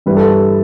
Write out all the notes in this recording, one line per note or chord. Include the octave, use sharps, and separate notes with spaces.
G2 E3 G3 B4
A4